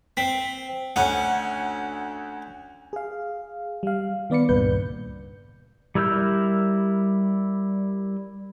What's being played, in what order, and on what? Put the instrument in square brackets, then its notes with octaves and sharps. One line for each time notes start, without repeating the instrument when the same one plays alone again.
[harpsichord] C4 [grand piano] B6
[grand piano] D2 F#5 [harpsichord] C#4
[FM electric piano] G#4 F5
G3 F5
D#3 B3 D5 B5 C#7
C#2 G2 A#2 B4 G6
[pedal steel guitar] G3 E4 A#4 E6 G6